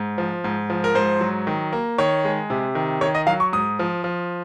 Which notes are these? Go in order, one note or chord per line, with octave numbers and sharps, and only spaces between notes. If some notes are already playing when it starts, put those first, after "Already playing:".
Already playing: G#2
F3
G#2
F3
A#4
G#2 C5
F#3
D#3
A#3
D#3 C#5
G#3
C3
D#3
D#3 C#5
D#5
F#3 F5
C#6
G#2 D#6
F3
F3